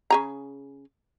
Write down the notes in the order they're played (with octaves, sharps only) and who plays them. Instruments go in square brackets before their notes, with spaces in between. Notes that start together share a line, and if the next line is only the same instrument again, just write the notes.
[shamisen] C#3 G#4 A#5